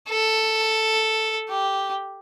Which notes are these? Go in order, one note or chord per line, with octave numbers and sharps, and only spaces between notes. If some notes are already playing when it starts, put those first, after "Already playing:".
A4
G4